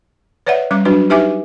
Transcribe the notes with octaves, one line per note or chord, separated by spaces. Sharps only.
B4 C#5 D5 E5 F#5
G3 C#4 D6
F#3 D4 F#4 B4
D#4 G4 B4 E5 G#5 D6